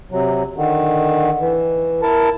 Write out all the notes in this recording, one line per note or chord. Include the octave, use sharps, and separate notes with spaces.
C3 F#3
D3 D#3
E3
E4 A#4 A5